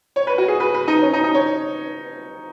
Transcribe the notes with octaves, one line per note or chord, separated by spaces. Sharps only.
C#5
B4
F#4
G#4
B4
B4
D#4
C#4
D#4
D#4
C#5